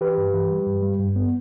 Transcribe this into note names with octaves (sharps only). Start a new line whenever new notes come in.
E3 G4 B4
G2
E3
G3
G2
G3
G2
B3